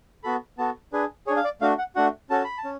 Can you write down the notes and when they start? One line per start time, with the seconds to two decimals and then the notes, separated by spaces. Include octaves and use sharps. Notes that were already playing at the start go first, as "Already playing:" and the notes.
0.23 B3 F#4 A4 B5
0.58 B3 F#4 A4 A5
0.93 D4 G#4 B4
1.27 G#4 C#5
1.30 D4
1.37 F5
1.44 D5
1.61 A3 D4 F#4 F5
1.78 F#5
1.96 A3 D4 F#4 F#5
2.30 C#4 F#4 A4 A5
2.44 B5
2.58 A5
2.64 C#4